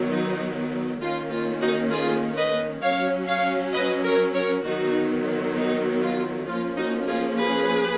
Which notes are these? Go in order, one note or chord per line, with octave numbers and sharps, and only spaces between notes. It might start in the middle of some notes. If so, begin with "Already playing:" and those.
Already playing: D#3 F#3 B3
D#4
D#3 A#3 C#4 F4
F4
D#4 F#4
F4 G#4
B4 D#5
F#3 C#4 C#5 F5
C#5 F5
B4 D#5
A#4 C#5
A#4 C#5
D#3 F#3 B3 D#4 F#4
D#4
F4
F3 A#3 C#4 F4
D#4 F#4
F4 G#4
G#4 B4